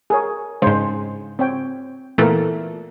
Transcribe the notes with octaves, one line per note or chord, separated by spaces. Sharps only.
G#4 A#4 C#5
G#2 C#3 G#3 D4 C5
C4 C#5 G5
A#2 E3 A3 B3 A#4